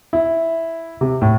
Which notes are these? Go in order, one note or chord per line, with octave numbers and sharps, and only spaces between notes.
E4
C3
A2